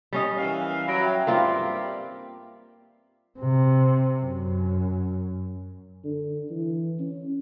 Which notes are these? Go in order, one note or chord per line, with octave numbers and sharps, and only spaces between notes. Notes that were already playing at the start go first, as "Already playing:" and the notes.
G3 C#4 D#5
E3 A#4 F5
F#3 B5 A#6 D7
E5 G5
G2 G3 A#3 C4 F4
C3
F#2
D3
E3
C#4